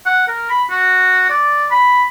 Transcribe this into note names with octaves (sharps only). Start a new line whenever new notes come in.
F#5
A#4
B5
F#4
D5
B5